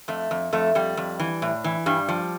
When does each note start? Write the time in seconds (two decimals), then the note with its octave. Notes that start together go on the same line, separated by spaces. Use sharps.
0.08 F2 A3
0.31 F2
0.52 F2 A3
0.75 F2 G3
0.97 F2
1.20 E3
1.42 A2
1.64 E3
1.86 G2 G3
2.09 F3